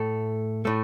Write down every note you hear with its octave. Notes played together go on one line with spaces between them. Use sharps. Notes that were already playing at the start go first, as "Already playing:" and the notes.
Already playing: A2 A3 A4
A2 A3